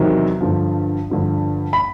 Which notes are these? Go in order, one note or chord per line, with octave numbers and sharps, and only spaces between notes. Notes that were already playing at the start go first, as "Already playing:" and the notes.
Already playing: E2 C3 D#3 F#3
G2 D3 F3
G2 D3 F3
B5